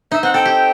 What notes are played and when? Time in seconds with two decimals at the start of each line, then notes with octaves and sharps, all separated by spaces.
0.12 D#4 E5
0.23 C4 F#5
0.34 A4 G5
0.45 G4